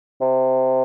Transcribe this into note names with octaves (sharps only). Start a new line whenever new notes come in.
C3